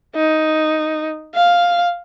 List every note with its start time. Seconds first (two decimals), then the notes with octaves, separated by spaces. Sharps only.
0.16 D#4
1.35 F5